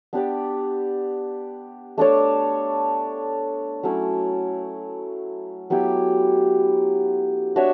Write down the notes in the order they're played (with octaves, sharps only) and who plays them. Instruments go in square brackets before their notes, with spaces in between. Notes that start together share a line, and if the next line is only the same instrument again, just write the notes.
[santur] B3 D4 G4 D5
A3 D4 A4 C#5
F#3 A3 C#4 E4
F#3 B3 E4 G4
D4 F#4 C#5 E5